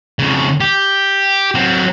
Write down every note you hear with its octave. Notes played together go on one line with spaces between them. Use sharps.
F2 C#3
G4
F#3 C4